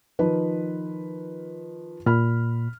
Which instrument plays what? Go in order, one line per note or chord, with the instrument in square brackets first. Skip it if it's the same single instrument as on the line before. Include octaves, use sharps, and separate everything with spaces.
[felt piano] D#3 F3 B4
[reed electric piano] A#2 [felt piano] B5 F6